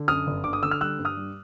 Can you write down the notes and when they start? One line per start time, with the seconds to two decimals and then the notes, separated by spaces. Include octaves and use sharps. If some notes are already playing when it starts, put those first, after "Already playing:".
Already playing: D3
0.08 F#2 D#6 F6
0.27 G1
0.44 D3 D6
0.53 D#6
0.63 D3 E6
0.71 F6
0.81 G3 E6 F#6
0.99 G2
1.05 D#6 F6
1.17 G3